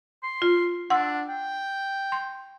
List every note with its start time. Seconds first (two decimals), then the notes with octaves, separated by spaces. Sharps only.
0.23 C6
0.42 F4
0.90 D4 F#5 C6 E6
1.28 G5
2.12 C6